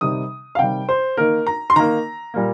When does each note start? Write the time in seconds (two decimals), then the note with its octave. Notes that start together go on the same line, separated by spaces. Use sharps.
0.01 C3 D#3 G3 D#6
0.55 F5
0.59 C3 D#3 G3 G5
0.89 C5
1.17 D#3 A#3 A#4
1.47 A#5
1.70 C6
1.76 D#3 A#3 A#5
2.34 A#2 G3 A#3